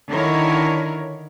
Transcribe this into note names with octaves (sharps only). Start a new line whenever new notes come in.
D3 D#3 E4 A#4 C#5